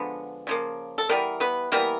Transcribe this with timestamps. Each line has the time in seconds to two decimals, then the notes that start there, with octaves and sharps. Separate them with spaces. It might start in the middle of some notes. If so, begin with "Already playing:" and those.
Already playing: D3 F3 G#3 B3
0.47 C#3 F3 A#3
0.98 A4
1.09 E3 G3 A#3 B3 A#4
1.40 B3 B4
1.72 E3 G3 A#3 B3 A#4